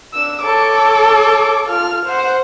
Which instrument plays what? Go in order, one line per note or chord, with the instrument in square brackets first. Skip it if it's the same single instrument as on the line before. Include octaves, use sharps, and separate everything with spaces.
[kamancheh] D4 E6
[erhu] A4 [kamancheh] C#5 D6
[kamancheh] F4 F6
C5 F#5